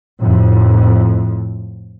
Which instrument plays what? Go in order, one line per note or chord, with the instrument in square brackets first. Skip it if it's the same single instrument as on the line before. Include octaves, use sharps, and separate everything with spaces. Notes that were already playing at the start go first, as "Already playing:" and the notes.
[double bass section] F2 A2